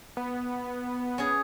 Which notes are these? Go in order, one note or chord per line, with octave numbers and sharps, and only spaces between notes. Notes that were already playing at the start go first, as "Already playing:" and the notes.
B3
C#4 G#4